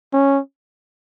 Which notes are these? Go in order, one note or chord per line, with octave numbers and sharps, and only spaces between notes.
C#4